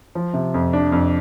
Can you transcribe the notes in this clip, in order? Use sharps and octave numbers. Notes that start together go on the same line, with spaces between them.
F3
C3
F2
D4
F2